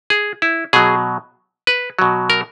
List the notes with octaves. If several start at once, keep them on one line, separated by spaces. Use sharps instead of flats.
G#4
E4
B2 F#3 G#4
B4
B2 F#3
A#4